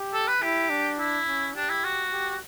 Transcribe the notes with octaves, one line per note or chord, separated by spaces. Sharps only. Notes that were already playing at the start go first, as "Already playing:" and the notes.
Already playing: G4
A4
B4
E4 G4
D4
E4
C#4
D4 G4
E4
F#4
G4